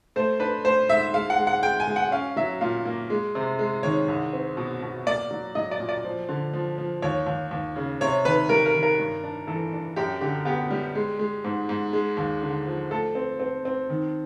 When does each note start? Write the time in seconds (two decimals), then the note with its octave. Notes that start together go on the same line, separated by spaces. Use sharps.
0.16 A3 C5
0.40 D4 B4
0.64 A3 C5
0.89 G#2 E5
1.14 G#3 F5
1.30 F#5
1.38 G#3
1.47 F#5
1.63 G#3 G5
1.80 G#5
1.87 G#3
1.96 F#5
2.11 C#4 F5
2.36 F#3 E5
2.61 A#2 F5
2.85 A#3
3.10 G#3
3.35 C3
3.59 G#3
3.83 D#3 C#5
4.08 C2
4.33 C4
4.57 B2
4.82 B2
5.06 A#3 D5
5.31 F#3
5.55 F#3 D#5
5.71 D5
5.80 A#2
5.89 D5
6.05 F3
6.29 D3
6.54 F3
6.78 F3
7.02 D#2 C#5
7.26 D#2
7.51 D#2
7.76 C#3
8.01 C3 C#5
8.25 D#3 B4
8.49 G3 A#4
8.66 A#4
8.75 D#3
8.83 A#4
8.99 G2
9.24 D4
9.47 E3 A4
9.73 D4
9.96 F#2 G4
10.21 D3 G4
10.45 B3 G4
10.71 G3
10.95 G#3
11.19 G#3
11.44 G#2
11.69 G#2
11.93 G#3
12.17 D#2
12.42 D3
12.66 F3
12.91 A3 A4
13.15 C4
13.40 C4
13.65 C4
13.90 D#3